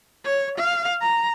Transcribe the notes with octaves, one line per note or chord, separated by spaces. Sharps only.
C#5
F5
A#5